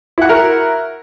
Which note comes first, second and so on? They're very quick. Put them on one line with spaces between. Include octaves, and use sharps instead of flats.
E4 F#5 F#4 A#4